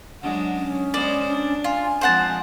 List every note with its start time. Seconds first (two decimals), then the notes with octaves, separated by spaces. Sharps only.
0.22 F#3 G#3 D4 F#5
0.54 C#4
0.94 G#3 B3 C5 D5
1.29 D4
1.64 F4 G#5
2.01 F3 G#3 C4 C5 F#5 A5